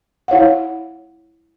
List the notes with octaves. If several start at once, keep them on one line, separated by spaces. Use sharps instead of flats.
E4 C#5 F5 F#5